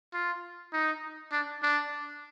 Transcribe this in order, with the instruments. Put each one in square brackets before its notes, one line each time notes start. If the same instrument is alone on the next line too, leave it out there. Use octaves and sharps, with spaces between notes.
[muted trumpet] F4
D#4
D4
D4